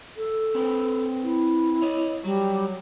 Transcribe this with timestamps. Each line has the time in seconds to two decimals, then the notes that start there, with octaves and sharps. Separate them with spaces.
0.17 A4
0.55 C4 B4 C5
1.23 E4
1.82 C#5 D#5
2.24 F#3 G3